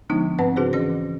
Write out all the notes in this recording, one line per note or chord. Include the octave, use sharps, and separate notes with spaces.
D3 F3 G#3 B3 D4 D#4
G#2 C4 B4 F#5
C#3 D4 F#4 G#4 B4 C5
E3 C#4 A#6